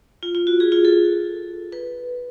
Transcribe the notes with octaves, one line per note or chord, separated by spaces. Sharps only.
F4
F4
F#4
G#4
F4
A4
B4